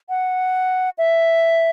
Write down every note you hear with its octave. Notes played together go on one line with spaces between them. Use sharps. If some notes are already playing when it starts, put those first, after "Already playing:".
F#5
E5